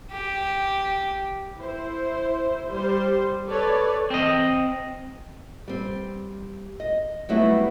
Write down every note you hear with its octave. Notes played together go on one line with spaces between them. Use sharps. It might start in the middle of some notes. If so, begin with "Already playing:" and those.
G4
E4 C5
G3 C5
A4 B4 C#5 D5
C4 D#5
G3 C4
D#5
F#3 G3 A3 B3 C4 E4